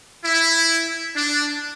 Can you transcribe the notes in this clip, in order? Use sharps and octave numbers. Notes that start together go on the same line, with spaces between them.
E4
D4